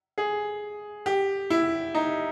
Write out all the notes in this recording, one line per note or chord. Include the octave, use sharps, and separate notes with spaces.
G#4
G4
E4
D#4